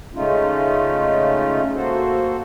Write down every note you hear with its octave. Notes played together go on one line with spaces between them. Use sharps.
C#3 G#3 A3 C#4 D#4 F4
A#3 F#4 A4 C5